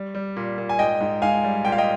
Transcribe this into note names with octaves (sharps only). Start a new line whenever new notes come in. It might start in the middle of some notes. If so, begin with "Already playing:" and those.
Already playing: G3
G3
A#2
A#2
G#5
G#2 D#5 G5
G#2
G#2 F5 G#5
G3
A#2 G5
F5
D#5 G5